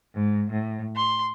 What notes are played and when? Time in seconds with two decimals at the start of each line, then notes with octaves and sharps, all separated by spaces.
0.13 G#2
0.51 A2
0.96 C6